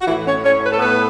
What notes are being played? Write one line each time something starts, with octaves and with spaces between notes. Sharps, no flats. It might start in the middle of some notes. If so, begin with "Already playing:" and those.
F#4
A2 E3 E4
C#4 C#5
A2 C#4 C#5
B4
A4
A2 B3 B4